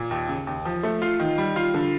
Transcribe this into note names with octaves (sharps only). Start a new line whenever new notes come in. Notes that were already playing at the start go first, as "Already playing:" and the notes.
Already playing: A#2
D#2
C#3
D#2
F3
A3
F4
D#3
G3
F4
D3